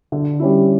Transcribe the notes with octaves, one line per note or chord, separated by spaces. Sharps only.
D3
G3 C#4 E4